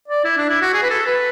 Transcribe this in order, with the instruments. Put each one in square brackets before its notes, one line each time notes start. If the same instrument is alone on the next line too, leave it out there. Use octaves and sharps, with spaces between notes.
[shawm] D5
E4
D4
E4
F#4
G#4
B4
A4
B4